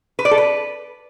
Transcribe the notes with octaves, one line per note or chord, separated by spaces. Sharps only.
B4
D5
A4
B4